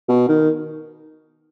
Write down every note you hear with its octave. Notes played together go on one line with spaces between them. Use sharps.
B2
D#3